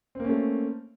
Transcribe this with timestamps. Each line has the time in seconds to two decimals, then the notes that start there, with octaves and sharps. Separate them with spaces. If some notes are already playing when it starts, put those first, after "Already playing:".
0.15 C4
0.20 A#3
0.24 C#4
0.29 A3